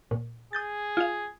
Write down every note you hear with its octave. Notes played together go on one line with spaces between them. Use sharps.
A#2
G#4 D#6 G6 A6
F4 F5